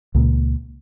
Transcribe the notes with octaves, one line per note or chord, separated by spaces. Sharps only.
C#2 A#2